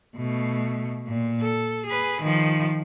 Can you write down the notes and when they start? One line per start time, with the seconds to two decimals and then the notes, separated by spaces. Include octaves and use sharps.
0.17 B2 A3
1.07 A#2
1.41 A4
1.87 G#4 B4
2.22 D#3 F3